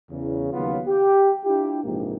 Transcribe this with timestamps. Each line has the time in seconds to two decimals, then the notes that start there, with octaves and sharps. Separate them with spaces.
0.11 E2 C#3
0.52 D#2 C#3 F#3 B3 F4
0.87 G4
1.45 D4 E4 F4 G4
1.84 A#1 G#2 C3 E3 G#3 A#3